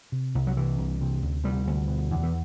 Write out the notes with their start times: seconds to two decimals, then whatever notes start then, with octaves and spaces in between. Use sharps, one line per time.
0.12 C3
0.35 C2
0.47 F#3
0.57 C3 E3
0.78 C2
1.01 C3
1.22 D2
1.44 C3 G3
1.67 D2
1.88 B2
2.10 E2
2.23 E3